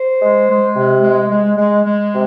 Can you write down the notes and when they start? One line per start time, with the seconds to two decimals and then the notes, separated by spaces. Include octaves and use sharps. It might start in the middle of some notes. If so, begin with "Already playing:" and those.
Already playing: C5
0.20 G#3
0.48 G#3
0.75 C3
1.02 G#3
1.30 G#3
1.56 G#3
1.84 G#3
2.11 C3